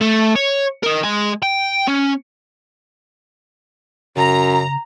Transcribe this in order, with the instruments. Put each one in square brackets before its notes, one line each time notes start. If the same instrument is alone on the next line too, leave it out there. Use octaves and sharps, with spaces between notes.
[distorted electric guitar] A3
C#5
D#4 A#4
G#3 G#5
G5
C#4
[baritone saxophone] F#2 [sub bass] C#3 [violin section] A#5